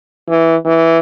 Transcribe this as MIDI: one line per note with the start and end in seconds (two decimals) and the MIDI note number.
0.29 0.56 52
0.65 0.99 52